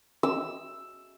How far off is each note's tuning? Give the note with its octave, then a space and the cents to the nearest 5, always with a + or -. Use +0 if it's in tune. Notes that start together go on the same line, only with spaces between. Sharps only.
E6 +5